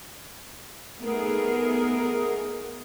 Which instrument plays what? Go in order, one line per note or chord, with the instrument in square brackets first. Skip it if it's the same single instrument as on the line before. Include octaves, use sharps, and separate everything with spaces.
[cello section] A3 B3 D#4 G#4 A#4